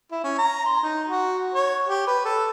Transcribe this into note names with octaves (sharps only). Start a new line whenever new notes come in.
E4
C#4
A#5
C6
D#4
F#4
C#5
G4
B4
A4